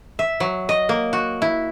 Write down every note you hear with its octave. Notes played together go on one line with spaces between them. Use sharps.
E5
F#3
D#5
A#3
F#4
E4